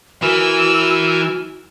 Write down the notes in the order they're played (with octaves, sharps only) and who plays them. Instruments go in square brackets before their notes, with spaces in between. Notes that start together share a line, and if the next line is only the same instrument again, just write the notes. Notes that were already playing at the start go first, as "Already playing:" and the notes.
[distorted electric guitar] E3 [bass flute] F#4 [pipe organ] A#4 G#5 [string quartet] E6